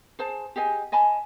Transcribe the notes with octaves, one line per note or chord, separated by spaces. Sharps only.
G#4 C5 A5
G4 G#4 D#5 G#5
D#5 G#5 A5 B5